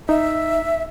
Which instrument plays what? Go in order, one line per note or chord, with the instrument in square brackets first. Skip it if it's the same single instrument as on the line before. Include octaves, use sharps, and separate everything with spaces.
[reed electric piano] D#4 [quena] E5